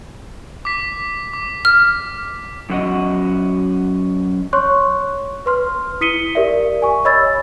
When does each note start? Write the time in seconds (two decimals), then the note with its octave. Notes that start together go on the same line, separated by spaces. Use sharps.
0.65 D6 B6
1.33 D6
1.65 F6
2.70 F#2 F#4 D#5
4.53 C#5 C6 C#6 F#6
5.46 B4 C6 F6
6.01 E4 D#6 B6 C#7 D#7 G7
6.35 G4 A#4 D5 E5
6.82 G#5 C#6
7.05 C#5 D#5 B5 E6 G#6 A6